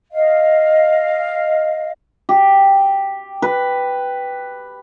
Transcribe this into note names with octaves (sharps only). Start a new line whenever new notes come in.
D#5 F5
G4
B4